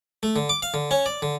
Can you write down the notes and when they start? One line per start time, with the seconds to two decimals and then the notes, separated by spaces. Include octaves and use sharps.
0.23 A3
0.36 D3
0.49 D6
0.62 F5
0.74 D3
0.91 C#4
1.06 D5
1.22 D3